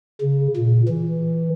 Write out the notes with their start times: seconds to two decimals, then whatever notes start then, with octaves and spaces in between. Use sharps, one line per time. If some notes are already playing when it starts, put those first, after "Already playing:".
0.21 C#3
0.57 A#2
0.88 E3